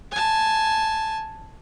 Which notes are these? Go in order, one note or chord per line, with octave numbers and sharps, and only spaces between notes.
G#5 A5